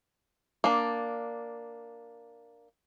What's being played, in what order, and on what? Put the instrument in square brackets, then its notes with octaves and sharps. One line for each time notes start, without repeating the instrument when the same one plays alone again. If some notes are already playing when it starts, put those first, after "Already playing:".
[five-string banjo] A#3 D4